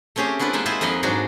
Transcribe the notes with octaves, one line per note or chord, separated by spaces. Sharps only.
A3 C4 C#4 G4 G#4
B3 D4 E4 F4 B4
G#3 A#3 D#4 E5
E4 F4 G#4 C5 E5
F2 A#3 D#4 B4 F#5 C6
G#2 F#3 D4 D#4 F#4